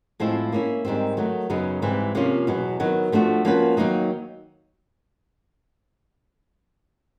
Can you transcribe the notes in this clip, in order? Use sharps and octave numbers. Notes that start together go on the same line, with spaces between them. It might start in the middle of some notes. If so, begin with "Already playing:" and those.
A2 F3 G#3 C4 E4
A#3 C#4 E4
G#2 D#3 G3 C4
D#3 F#3 A3
F#2 C#3 F#3 B3 D#4
G#2 E3 G3 C4
C3 F3 A#3 C#4 F4
E2 B2 F#3
D#3 F#3 B3
F3 A3 D4 F#4
F3 A#3 C#4 F#4 B4
D#3 F#3 A#3 D#4